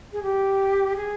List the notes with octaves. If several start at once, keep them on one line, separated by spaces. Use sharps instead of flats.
G#4
G4
G#4